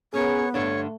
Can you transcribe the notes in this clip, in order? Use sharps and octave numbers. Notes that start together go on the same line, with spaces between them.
B3 C#4 G#4 A#4 C#5
G2 D3 A3 D4 C#5